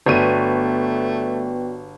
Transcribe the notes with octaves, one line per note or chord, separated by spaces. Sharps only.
G1 A3 B3 F#4 B4 D5 G5 D#7